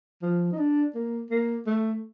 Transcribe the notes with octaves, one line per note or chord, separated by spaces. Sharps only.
F3
D#4
D4
A#3
A#3
A3